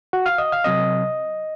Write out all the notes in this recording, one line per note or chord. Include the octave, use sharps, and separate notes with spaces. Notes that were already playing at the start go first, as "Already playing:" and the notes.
F#4 F#5
F5 F6
D#5 D#6
F5 F6
C3 F#3 C4 D#5 D#6